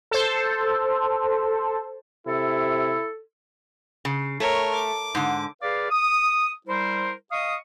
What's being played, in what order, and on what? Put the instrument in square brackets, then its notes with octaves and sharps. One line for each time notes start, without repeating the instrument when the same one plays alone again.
[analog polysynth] A4 C5
[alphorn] C3 [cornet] E4 [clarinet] A4
[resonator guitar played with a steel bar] C#3
[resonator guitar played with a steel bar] A3 [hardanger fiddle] A#4 C#5
[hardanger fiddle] D6
[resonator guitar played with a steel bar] G#2 D3
[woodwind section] G#4 B4 D5 F5
D#6
G3 E4 A#4 C5
D#5 F5 C#6 D#6